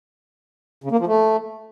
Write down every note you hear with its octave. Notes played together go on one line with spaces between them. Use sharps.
C#3
A#3
F3
A3